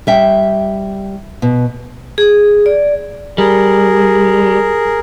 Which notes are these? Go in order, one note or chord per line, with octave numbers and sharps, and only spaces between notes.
G3 E5 G5
B2
G#4
D5
G3 G#4 A#4